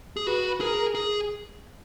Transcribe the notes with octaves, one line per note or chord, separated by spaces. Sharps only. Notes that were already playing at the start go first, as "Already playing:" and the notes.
G#4
F#4 B4
G#4 A#4
G#4